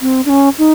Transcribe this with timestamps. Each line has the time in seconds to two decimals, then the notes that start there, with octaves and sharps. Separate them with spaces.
0.01 C4
0.26 D4
0.29 C#4
0.58 D#4